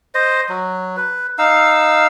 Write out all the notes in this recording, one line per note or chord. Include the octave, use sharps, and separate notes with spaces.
C5 D#5
F#3
B4
D#4 F5 E6